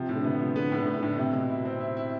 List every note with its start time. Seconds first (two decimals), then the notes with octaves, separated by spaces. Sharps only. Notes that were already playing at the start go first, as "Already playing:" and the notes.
Already playing: C3 F3
0.09 A2
0.15 D3
0.24 C3 B3
0.39 F3
0.56 D3 B3
0.72 A2 D3
0.87 A2
0.97 D3
1.03 A2
1.18 C3 E4
1.33 B2
1.50 E4
1.65 C4
1.80 E4
1.97 E4